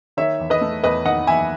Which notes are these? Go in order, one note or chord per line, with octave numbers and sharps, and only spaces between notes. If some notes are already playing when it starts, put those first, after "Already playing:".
D#3 C#5 E5
E2
B4 D#5
A3
E2 B4 D#5
D#3 D#5 F#5
E2 E5 G#5